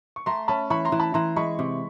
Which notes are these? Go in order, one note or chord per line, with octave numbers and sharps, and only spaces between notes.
C#6
A3 A#5 C6
C#4 A5 B5
E3 B5 C#6
A#5 C6
E3
A5 B5
E3 A#5 C6
G#3 B5 C#6
C3